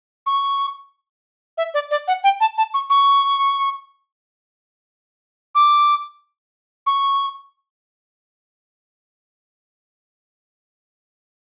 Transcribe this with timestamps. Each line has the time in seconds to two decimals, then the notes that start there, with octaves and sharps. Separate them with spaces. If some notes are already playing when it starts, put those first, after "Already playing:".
0.26 C#6
1.58 E5
1.74 D5
1.91 D5
2.08 F#5
2.24 G5
2.40 A5
2.57 A5
2.74 C#6
2.90 C#6
5.55 D6
6.87 C#6